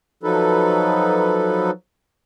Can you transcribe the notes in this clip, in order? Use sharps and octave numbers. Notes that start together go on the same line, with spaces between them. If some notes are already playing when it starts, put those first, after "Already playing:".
F3 F#3 D#4 A4 B4